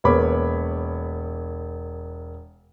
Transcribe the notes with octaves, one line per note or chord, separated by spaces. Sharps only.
E1 A#3 B3 C#5 B5 D6